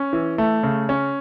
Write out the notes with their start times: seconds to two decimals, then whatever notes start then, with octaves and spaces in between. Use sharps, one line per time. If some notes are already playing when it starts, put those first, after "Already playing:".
Already playing: C#4
0.13 E3
0.38 A3
0.63 C#3
0.89 C#4